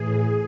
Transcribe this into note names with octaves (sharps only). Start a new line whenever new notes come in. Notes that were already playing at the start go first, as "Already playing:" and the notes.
Already playing: A2 E3 G#4